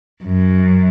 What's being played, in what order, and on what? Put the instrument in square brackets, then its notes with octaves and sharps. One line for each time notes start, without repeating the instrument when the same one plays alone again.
[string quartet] F#2